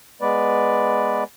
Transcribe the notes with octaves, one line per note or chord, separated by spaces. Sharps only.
G#3 B3 B4 D5